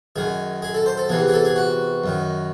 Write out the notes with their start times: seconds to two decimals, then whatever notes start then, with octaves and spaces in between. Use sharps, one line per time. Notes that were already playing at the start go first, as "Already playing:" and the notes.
0.16 F#2 D#3 G#4
0.62 G#4
0.74 A4
0.86 C5
0.97 A4
1.09 E2 C3 E3 G#4
1.28 G#4
1.33 A4
1.45 G#4
1.56 F#4
2.04 F#2 D#3